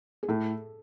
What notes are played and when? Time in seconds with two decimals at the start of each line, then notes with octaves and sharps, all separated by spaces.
0.23 G#4
0.29 A2 A4